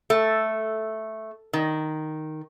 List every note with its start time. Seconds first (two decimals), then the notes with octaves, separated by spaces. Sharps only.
0.10 A3
1.53 D#3